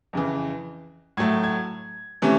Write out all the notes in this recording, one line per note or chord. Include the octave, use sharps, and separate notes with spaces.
F2 C#3 E3
A2 F#3 A3 G#6
G#6
C3 E3 A3 C#4